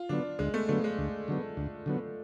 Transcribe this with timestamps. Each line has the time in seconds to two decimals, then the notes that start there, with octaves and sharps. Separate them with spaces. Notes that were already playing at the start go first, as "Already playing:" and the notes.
Already playing: F4
0.09 D3 F#3 B3 D4
0.39 D2 G#3
0.54 A3
0.69 D3 F#3 A3 B3
0.84 G#3
0.98 D2
1.28 D3 F#3 B3
1.57 D2
1.86 D3 F#3 B3